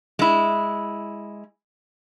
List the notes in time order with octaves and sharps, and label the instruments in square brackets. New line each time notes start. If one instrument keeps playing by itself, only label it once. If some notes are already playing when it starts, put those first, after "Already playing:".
[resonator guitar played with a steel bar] G#3 E4